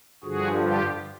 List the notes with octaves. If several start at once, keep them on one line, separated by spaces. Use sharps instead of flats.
G2 D3 F3 F#4 G#4
F4 G4